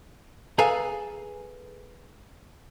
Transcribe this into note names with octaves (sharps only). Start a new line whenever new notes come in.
G#4 A4 B4 F5 G#5 A#5